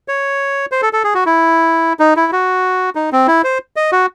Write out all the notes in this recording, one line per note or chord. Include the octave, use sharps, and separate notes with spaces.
C#5
C5
A4
A4
G#4
F#4
E4
D#4
E4
F#4
D#4
C4
E4
C5
D#5
F#4